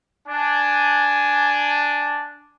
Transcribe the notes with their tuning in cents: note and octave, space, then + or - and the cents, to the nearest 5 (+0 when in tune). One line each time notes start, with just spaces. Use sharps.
D4 +0 G#5 +10